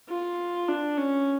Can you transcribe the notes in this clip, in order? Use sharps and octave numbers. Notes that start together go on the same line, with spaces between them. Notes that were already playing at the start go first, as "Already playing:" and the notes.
F4
D4
C#4